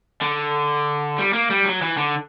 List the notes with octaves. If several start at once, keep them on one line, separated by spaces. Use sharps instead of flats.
D3
G3
A#3
G3
F#3
E3
D3